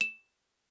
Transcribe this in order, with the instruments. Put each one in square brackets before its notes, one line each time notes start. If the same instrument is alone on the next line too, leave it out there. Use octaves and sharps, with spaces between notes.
[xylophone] E7